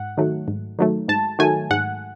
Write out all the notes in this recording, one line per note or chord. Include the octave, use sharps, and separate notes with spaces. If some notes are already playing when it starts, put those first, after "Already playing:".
Already playing: G#2 F#5
D#3 F#3 A3
G#2
D#3 F#3 A3
G#2 A5
D#3 F#3 A3 G#5
G#2 F#5